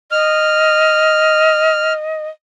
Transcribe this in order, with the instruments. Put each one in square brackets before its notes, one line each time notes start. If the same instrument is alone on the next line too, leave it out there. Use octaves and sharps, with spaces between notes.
[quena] D#5 [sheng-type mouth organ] F6